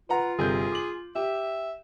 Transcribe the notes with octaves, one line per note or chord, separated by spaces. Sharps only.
F4 B4 F#5 A#5
G1 C3 G#4 G6
D6 F#7
G4 E5